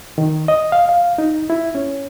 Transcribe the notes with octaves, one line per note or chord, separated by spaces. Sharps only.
D#3
D#5
F5
F5
D#4
E4
C#4